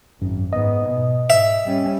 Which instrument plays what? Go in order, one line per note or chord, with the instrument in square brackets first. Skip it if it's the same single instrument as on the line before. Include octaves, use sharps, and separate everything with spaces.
[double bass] G#1 [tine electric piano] F#2
[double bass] G#2 B3 [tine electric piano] D#5
[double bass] B2
[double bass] G#2 [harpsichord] E5
[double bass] G3 C#4